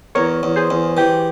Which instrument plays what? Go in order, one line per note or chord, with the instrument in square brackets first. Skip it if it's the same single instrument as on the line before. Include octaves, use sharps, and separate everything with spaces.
[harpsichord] E2 [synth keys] A#4 C#5
[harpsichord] E2
[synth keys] G#4 C5
[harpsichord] E2
[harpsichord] E3 [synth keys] G4